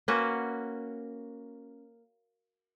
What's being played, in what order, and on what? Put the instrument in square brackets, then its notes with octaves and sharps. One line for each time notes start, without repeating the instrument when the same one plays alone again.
[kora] A#3 C#4 F#4 B4